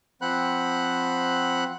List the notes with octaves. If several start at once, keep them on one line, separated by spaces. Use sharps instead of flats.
F3 C4 C5 F#5 B5 F#6